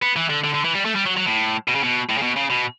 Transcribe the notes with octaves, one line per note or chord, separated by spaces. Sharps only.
B3
E3
D3
D3
D3
E3
G3
A3
G3
F#3
F#3
A2
B2
C#3
B2
A2
C#3
B2
C#3
B2